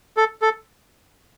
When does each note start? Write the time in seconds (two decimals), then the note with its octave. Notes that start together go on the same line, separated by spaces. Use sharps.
0.17 A4
0.42 A4